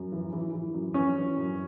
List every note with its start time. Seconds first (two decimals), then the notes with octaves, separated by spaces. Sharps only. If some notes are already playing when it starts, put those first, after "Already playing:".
Already playing: F#2
0.12 E3
0.33 E3
0.53 E3
0.74 F#2
0.94 E3 C#4
1.16 E3
1.37 F#2